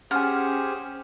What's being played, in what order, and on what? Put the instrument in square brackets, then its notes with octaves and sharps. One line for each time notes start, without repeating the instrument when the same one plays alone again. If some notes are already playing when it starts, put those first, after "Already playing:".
[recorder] C#4 [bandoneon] G4 G#4 C5 [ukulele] F#5 G#5 [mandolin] F6